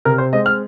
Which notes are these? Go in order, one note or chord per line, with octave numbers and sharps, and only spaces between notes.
C3 A#4
C5
G#3 C4 D#5
F6